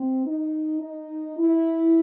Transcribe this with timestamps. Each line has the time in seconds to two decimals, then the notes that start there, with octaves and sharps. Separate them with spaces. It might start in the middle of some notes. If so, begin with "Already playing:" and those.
Already playing: C4
0.25 D#4
0.82 D#4
1.37 E4